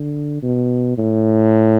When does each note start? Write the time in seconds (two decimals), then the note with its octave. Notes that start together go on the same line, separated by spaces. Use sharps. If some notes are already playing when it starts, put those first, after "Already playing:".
Already playing: D3
0.43 B2
0.98 A2